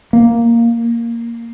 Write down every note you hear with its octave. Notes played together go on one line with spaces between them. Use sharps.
A#3